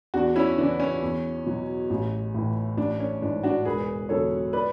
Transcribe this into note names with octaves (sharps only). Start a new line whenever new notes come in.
E2 D4 F#4
C#4 E4
C#3 E3 D4
C#4
E2
B2 F#3
A1
A2 E3
A1 D4
C#4
G#2 E3 D4
D4 F#4
E1 G#4 B4
E2 D3 F#3 A4 C#5
B4 D5